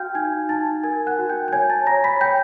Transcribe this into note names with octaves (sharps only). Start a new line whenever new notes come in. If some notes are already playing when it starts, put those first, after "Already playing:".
Already playing: F#4 F5 G5 F6 G6
D#4 G#5 G#6
D#4 A5 A6
A#4 G#5 G#6
F#5 F#6
F#4
G5 G6
G6
C#5 G#5 G#6
A5 A6
C#5 A#5 A#6
B5 B6
C#5 G5 G6